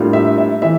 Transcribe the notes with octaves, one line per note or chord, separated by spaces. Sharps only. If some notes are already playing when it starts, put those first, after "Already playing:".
Already playing: A2 G3 A#3 D4 F4
E5
E5
E3 E5